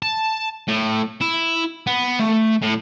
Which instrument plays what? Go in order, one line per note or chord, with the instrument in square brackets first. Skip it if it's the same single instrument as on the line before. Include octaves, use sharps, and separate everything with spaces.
[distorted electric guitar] A5
A2
E4
B3
A3
A2